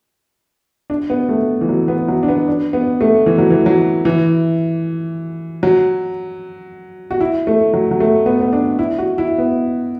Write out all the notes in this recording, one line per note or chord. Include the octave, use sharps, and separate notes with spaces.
D4
B3
A3
E3
F#3
B3
F#3
D4
B3
D4
B3
A3
E3
F#3
E3
F#3
E3
F#3
F#4
E4
A3
F#3
F#3
A3
B3
B3
D4
E4
F#4
E4
B3